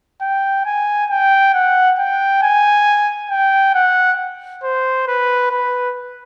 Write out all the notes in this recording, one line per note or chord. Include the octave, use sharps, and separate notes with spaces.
G5
G#5
G5
F#5
G5
G#5
G5
F#5
C5
B4
B4